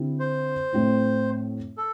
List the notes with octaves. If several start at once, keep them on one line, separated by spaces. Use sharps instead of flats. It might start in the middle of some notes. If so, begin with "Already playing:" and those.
Already playing: D3 C4 E4 G4
C5
A2 A3 C4 E4
A4